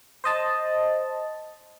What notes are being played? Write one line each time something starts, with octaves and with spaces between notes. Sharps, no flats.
C5 D#5 A5